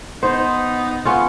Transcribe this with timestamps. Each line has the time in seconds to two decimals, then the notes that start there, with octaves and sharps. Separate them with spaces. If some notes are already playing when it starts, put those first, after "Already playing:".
0.23 B3 D#4 C5
1.05 B3 C#4 F4